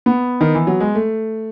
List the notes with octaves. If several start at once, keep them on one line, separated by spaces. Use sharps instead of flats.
B3
D#3
E3
F#3
G#3
A3